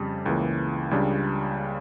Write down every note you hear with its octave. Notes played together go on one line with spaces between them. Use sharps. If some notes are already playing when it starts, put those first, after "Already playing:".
Already playing: F2 C#3 G3
C#2 C#3 E3 A#3
C#2 C#3 G3 D4